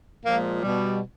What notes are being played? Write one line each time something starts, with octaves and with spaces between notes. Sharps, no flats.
A#2 F3 G#3 A#3
B2 G3